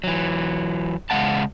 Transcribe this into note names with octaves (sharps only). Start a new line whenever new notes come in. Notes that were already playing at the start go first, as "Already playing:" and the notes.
E3 F#3
C#3 G#3 A3 F5 F#5 A5